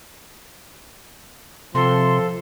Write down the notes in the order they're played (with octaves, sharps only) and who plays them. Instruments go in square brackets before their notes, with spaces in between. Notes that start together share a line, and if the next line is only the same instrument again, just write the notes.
[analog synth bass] C3 [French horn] F3 [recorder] A4 [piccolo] C6